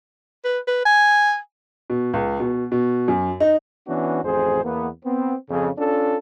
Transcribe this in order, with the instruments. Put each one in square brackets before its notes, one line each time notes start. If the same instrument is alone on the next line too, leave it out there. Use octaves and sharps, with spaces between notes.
[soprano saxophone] B4
B4
G#5
[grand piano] B2
C#2
B2
B2
F#2
D#4
[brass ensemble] E3 B3 C#4 D4 F#4
A1 F2 G#4 C5
E2 A#3 B3
B3 C4
F2 C#3
C#4 D4 F4 A4